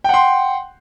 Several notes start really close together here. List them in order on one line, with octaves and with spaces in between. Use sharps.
G5 F#5 C6